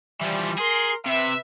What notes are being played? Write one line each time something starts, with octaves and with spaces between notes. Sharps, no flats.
E3 F3 G3
G#4 A#4 C6
C3 B4 E5